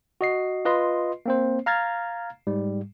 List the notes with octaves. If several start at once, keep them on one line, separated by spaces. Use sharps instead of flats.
F#4 D#5 C7
F4 B4 D#5 C6
A#3 C4 C5
F5 A#5 F6 G#6 A6
G#2 G3